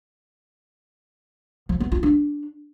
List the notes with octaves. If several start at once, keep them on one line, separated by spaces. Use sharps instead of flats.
F3
B3
F4
D4